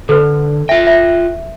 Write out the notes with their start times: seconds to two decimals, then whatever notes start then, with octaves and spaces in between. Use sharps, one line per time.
0.09 D3 A4 B4
0.69 F4 E5 G5
0.87 E5